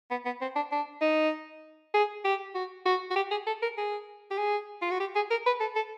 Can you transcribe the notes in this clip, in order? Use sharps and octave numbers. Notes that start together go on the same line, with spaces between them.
B3
B3
C4
D4
D4
D#4
G#4
G4
F#4
F#4
F#4
G4
G#4
A4
A#4
G#4
G4
G#4
F4
F#4
G4
G#4
A#4
B4
A4
A4